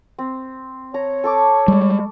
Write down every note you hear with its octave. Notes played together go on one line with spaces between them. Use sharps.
C4
C#5 A#5
A4 C#6 D6
G3 G#3